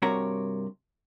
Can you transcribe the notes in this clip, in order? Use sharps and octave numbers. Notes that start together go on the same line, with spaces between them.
G2 C3 F#4 A#4 C#5 A#5